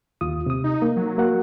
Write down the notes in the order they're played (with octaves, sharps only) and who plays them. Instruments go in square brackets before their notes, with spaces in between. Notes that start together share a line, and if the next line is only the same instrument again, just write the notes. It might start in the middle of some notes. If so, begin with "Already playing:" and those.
[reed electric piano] D#2 F4 D#6
C3 D#6
[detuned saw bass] D#4
[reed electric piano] A#3
[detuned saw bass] F#3
[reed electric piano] A#3 F#4 F#5